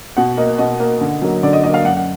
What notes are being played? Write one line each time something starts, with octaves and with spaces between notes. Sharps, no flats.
B2 F#5
A#3 D#5
B2 D#5
A#3
D3
F#3 A#3
D3 D5
D#5
F#3 A#3 D#5
F5
F#2 F#5
F#5